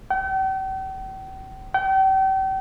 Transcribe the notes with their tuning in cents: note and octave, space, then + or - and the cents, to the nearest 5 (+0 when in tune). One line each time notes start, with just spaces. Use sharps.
G5 -40
G5 -35